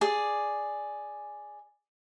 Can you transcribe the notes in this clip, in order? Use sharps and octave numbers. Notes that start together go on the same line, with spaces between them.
G#4 D5